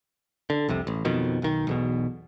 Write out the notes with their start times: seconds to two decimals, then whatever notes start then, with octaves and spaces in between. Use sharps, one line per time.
0.50 D3
0.68 C2 F2 C3
0.87 A1
1.05 F2 B2 D#3
1.42 B1 D#3
1.67 B1 E2 B2